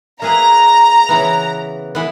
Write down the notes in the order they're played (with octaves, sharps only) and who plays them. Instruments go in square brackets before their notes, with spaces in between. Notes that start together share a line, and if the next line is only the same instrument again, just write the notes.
[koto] A#3 E4 G#4 B4 [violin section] A#5
[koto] C#3 E3 B3
E3 B3